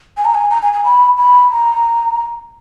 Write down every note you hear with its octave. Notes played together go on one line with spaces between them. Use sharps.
G#5
A#5
G#5
A#5
G#5
G#5
B5
B5
A#5